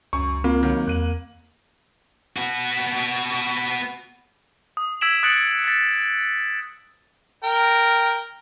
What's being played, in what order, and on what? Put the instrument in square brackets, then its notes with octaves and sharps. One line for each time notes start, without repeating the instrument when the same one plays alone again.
[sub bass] C#2 [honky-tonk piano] F#2 [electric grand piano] C#6
[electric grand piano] A#3 [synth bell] C4 [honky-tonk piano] F4
[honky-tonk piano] D#3 F#3
[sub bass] E2 [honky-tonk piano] F#6 D#7 F#7
[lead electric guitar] B3 F#4
[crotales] D#6
E6 G#6 B6 D7 E7 F#7
D#6 F#6 A6 C#7 D7 F#7
A6 B6
[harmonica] A#4 G5